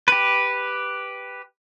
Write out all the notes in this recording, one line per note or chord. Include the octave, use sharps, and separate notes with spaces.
G4 B4